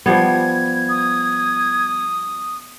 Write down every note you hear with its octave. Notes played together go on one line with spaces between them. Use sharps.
F3 G3 B3 G#6
D#6